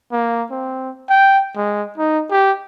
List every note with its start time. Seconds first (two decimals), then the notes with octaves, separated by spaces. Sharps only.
0.12 A#3
0.51 C4
1.10 G5
1.56 G#3
1.98 D#4
2.31 G4